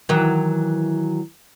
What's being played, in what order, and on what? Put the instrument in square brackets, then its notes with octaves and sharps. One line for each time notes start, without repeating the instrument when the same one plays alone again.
[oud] D#3 E3 F#3